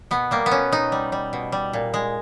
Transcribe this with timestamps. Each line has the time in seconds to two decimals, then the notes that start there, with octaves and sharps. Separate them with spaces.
0.11 B2 B3
0.31 G3 A#3
0.46 B3
0.51 B2 C#4
0.72 B2 D#4
0.92 G3
1.12 G3
1.33 B2
1.52 G3
1.73 A#2
1.94 G#3